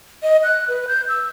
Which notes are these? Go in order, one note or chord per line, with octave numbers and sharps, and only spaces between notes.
D#5
F#6
B4
G6
E6